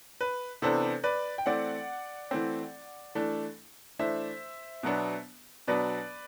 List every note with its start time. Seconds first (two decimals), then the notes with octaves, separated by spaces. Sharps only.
0.21 B4
0.62 C3 E3 B3 D4 A4 C5
1.04 B4 D5
1.38 G5
1.46 E3 A3 C4 D5 F#5
2.31 E3 A3 C4
3.15 E3 A3 D4
3.99 E3 A3 D4 C5 E5
4.83 B2 F#3 B3 D4
5.68 B2 F#3 B3 D4 B4 D5